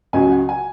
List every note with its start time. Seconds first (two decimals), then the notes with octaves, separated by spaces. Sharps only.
0.13 C#2 C#3 F#3 G#5
0.31 F#5
0.49 G#5